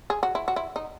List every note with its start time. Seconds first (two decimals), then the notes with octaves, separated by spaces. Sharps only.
0.10 G#4
0.23 F#4
0.35 E4
0.48 F#4
0.56 E4
0.76 D#4